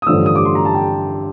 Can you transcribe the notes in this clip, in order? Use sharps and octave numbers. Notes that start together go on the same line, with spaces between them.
D#6
A1 G2 D3 F3 E6
D#6
D6
C6
A#5
A5
G5